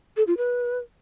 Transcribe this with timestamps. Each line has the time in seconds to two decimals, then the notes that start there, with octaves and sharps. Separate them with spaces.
0.17 A4
0.27 F4
0.37 B4